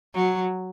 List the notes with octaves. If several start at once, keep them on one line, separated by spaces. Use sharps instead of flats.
F#3